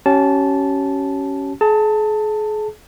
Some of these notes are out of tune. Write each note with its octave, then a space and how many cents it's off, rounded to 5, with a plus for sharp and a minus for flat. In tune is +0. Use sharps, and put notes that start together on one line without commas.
C#4 +0 G4 -45 A5 -10
G#4 +40 A5 +20